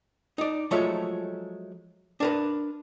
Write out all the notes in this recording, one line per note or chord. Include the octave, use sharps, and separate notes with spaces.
D#4 D5
F3 F#3 G#3 A3 C#5 E5
D4 A#4 B4